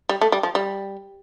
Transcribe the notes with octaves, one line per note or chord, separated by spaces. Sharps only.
G3
A3
G3
F3
G3